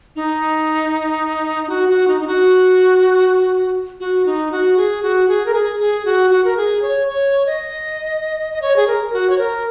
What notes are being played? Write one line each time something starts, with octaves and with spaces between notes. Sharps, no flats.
D#4
F#4
F#4
D#4
D#4
F#4
F#4
D#4
F#4
G#4
F#4
G#4
A#4
G#4
G#4
F#4
F#4
A#4
G#4
C#5
C#5
D#5
D#5
C#5
G#4
A#4
F#4
C#5
A#4